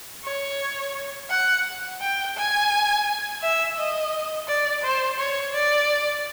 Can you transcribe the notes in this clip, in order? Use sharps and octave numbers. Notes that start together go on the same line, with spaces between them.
C#5
F#5
G5
G#5
E5
D#5
D5
C5
C#5
D5